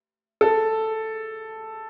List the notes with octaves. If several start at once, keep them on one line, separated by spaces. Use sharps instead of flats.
A4